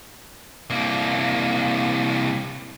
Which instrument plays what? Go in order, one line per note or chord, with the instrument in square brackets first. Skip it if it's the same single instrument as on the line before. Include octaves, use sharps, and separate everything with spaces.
[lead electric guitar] C2 A#3